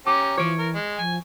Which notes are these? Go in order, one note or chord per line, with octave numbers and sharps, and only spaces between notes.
C#4 G4 A#5 D6
E3 F3 C#5 D7
A#4
G#3
F3 G#5